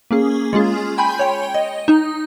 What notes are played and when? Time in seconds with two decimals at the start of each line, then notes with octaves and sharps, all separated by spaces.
0.11 A#3 C#4 G#4
0.53 G#3 C#4 F4 G#4
0.98 G5 G#5 B5 C6 G6
1.19 C#5 G5
1.54 D#5
1.88 D#4